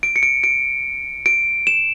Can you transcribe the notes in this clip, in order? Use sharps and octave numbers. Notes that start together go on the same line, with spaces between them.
D7
C#7
D7
D7
D7
E7